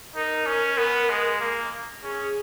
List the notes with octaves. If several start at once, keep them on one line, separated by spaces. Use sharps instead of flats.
D#4 A#4
C#4
B3
G#3
A#3
C#4 G#4